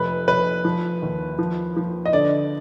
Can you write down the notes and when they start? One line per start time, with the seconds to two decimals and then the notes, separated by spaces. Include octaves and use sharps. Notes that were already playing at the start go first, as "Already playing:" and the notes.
Already playing: F1 B4
0.28 F1 B4
0.65 F3
1.02 D#2
1.39 F3
1.76 F3
2.06 D#5
2.13 D3 D5